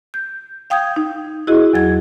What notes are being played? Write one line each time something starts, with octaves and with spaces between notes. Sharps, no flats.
G6
F5 G5 D#6 G6 G#6
D#4
E4 F#4 G#4 D#5
E2 F#3 G#6